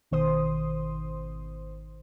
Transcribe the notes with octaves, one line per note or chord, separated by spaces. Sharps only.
G#1 B2 D#3 C5 C6 D#6